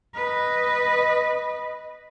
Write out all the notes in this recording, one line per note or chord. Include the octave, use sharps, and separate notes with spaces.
B4 D#5